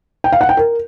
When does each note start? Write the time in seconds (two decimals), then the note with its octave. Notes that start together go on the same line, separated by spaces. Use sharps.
0.24 G5
0.32 F5
0.41 F#5
0.49 G5
0.57 A#4